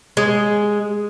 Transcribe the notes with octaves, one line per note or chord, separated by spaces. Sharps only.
G#3